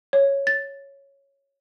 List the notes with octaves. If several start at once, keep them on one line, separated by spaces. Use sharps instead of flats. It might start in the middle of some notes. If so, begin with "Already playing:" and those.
C#5
A6